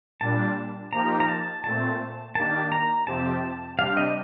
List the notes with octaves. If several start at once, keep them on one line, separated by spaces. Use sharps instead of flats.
A#2 G3 D4 A5
F3 A#3 D#4 G4 A#5
A#5
A5
A#2 A3 C4 A5
D#3 A#3 D4 G4 A5
A#5
F2 C3 F3 C4 G4 A5
C3 G3 D4 G4 F5
D#5